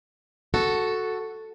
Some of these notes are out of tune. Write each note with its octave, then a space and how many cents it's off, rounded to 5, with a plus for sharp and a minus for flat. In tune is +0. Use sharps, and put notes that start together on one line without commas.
F#4 +0 A4 +0